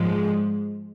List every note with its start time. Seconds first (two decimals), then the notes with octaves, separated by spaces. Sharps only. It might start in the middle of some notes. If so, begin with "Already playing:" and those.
Already playing: G#2 F3 G#3